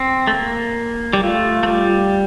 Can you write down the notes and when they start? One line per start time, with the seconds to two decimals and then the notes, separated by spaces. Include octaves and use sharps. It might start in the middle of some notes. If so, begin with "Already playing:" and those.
Already playing: C4
0.27 A3
0.34 A#3
1.13 G3
1.23 A3 F4
1.63 A3
1.67 G3